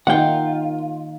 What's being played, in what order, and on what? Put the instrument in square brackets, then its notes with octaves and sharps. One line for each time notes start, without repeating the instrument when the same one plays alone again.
[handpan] D#3 A#3 D#4 [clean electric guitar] F4 [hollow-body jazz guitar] F#5 G5